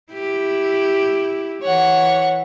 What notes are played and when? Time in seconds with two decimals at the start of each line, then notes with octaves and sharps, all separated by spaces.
0.13 E4 G4
1.63 E3 C#5 F#5